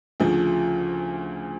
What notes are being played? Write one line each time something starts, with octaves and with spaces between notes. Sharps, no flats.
D2 C#3 F3